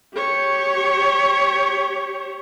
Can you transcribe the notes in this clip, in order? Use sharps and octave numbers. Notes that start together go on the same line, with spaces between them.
G4 C#5